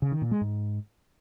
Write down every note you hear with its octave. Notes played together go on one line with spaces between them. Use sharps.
C#3
D#3
A#2
G#3
G#2